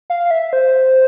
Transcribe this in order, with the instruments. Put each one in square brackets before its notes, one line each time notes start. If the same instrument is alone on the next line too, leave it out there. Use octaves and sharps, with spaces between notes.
[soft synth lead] F5
E5
C5